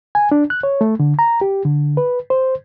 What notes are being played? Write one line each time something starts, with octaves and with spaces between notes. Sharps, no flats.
G#5
D4
F#6
C#5
A3
D3
A#5
G4
D3
B4
C5